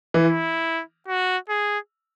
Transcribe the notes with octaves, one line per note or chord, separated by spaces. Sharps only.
E3
E4
F#4
G#4